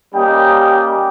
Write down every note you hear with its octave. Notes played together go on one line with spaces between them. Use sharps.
G3 A#3 C#4 G4 D#5 G5